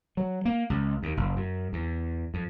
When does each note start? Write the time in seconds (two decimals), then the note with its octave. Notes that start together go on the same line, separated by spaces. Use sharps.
0.17 F#3
0.45 A#3
0.70 C#2
1.03 D#2
1.17 F#1
1.36 F#2
1.73 E2
2.34 F2